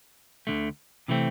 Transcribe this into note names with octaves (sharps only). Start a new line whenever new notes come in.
D2 D3 A3
C3 E3 A3 C4